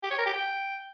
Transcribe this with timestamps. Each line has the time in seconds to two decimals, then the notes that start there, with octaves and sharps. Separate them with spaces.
0.03 G4
0.11 C#5
0.18 A#4
0.26 G4
0.33 G5